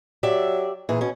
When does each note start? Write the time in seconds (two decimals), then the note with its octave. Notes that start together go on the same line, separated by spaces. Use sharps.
0.23 F#3 G4 D5 E5
0.89 A#2 E3 G#4
1.01 B2 C#4